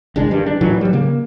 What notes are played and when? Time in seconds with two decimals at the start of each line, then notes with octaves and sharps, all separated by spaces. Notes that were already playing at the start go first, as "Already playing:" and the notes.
0.16 G1 C2 G#3 D4
0.31 G2 D#3 G3
0.46 D4
0.61 A2 D#3 E3 F#3
0.81 F#3 G3
0.93 C#3 A#3